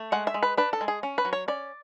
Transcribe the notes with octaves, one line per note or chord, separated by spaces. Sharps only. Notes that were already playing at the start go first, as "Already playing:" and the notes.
Already playing: A3
G#3 F#5
E5
G#3
B4
D4 B4
A4
G#3
G#4
C#4
B4
F#3
C#5
C#4 D5